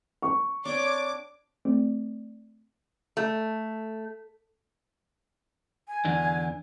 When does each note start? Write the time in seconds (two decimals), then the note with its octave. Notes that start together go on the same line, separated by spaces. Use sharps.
0.22 C#6
0.65 C4 D4 C#5 D6
1.65 A3 C4 D5
3.17 A3
5.88 G#5
6.05 E2 D3 D4